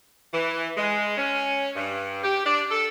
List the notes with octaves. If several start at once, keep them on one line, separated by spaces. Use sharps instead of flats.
E3
G#3
C#4
G2
G4
D4
A4